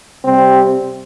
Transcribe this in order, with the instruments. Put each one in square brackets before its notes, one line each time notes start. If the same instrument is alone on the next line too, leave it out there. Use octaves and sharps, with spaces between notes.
[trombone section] C3 G3 C4